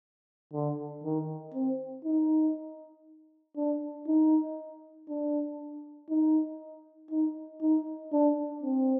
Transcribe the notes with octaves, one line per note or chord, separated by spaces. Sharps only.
D3
D#3
C4
D#4
D4
D#4
D4
D#4
D#4
D#4
D4
C4